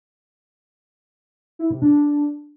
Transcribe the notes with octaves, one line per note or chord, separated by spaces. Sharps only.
E4
C3
D4